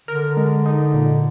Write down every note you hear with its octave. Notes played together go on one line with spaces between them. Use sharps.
D3 A#4
G#3
D#4
A#2